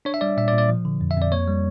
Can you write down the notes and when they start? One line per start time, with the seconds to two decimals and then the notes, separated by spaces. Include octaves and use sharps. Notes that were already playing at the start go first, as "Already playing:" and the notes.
0.05 D4 C#5
0.14 E5
0.21 G3 D5
0.37 A#2 E5
0.48 D5
0.53 A#2
0.58 D5
0.69 F3
0.85 D3
1.01 F2
1.11 E5
1.17 F2 D5
1.32 A#3 C#5
1.48 G3